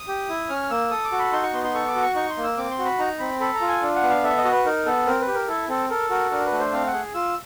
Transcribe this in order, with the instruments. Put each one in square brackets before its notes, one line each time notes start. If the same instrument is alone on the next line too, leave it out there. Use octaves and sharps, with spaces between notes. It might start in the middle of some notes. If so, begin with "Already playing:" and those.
Already playing: [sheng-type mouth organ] D#6
G4
E4
C#4 F6
A#3 E6
A4 D#6
D6
F#4
B5
D#4 C6
C#6
B3 C6
C6
A4 C#6
D6
F#4
C#6
D#4 C#6
C6
A#3
E6
C4 D6
C6
F#4
B5
D#4 A#5
C4 B5
A4 B5
A#5
F4
G#5
D4
F#5
B3
F5
A4 E5
D#5
F#4
B4
D#4 A#4
B3 A4
C4 A#4
B4
G4
A#4
E4 A4
C4 A4
A4 A#4
F#4 A#4
D4 A#4
B4
A3
C5
C4 F5
F#5
G#4
F4 E6